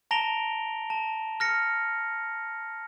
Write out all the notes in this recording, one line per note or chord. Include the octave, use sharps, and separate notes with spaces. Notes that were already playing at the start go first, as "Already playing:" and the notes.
A5 A#5 A#6 D7 F7 G7
A5
F6 A#6 C#7